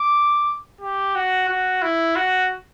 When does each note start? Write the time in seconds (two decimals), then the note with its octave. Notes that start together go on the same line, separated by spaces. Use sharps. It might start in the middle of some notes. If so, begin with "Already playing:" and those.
Already playing: D6
0.81 G4
1.15 F#4
1.48 F#4
1.82 E4
2.16 F#4